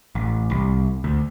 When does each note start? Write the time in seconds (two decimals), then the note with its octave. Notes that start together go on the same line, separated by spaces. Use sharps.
0.15 A1
0.51 C2
1.04 D2